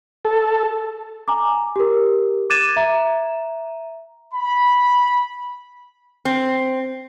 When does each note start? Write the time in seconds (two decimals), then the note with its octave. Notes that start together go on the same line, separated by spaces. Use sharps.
0.25 A4
1.28 G#5 A#5 D6
1.76 G4 A#4
2.50 D6 F#6 G#6 A6 D#7 E7
2.76 E5 A#5
4.33 B5
6.25 C4